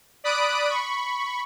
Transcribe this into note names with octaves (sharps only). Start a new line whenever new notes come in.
D5 B5 D#6 F#6 D7
B5 C#6